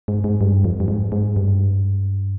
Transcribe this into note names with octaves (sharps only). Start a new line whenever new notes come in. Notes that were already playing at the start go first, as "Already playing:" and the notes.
G#2
G#2
G2
F2
G2
G#2
G#2
G2